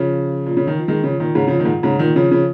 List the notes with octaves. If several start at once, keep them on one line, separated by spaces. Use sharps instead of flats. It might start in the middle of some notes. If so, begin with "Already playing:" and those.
Already playing: C#3 F3
A#2
C#3
D#3
F3
D#3 G#3
C#3 F3
A#2 D#3
G#2 C#3
C#3 F3
A#2 D#3
G#2
A#2
G#2 C#3
A#2 D#3
C#3 F3
C#3 F3